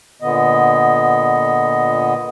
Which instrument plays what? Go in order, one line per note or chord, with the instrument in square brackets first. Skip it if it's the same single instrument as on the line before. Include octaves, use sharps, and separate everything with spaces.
[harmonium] A#2 D3 B3 D#5